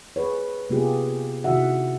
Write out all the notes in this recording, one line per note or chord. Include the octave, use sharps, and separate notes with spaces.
G#4 B4 C#5
C3 A#3 B3 F4 G4 G#4
C3 D#3 E4 F#4 E5 F#5